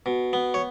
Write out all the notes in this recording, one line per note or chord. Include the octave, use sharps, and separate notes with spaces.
B2
B3
C#5